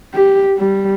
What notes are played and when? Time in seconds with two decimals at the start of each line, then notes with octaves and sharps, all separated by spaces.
0.14 G4
0.58 G3